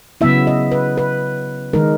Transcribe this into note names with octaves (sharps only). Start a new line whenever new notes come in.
C#3 F#3 B3 E4 E5
D#5
B4
B4
D#3 G#3 D#4 A#4